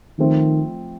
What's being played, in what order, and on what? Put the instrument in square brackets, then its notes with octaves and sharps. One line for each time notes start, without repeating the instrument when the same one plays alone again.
[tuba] D#3 [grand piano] F3 A3 C4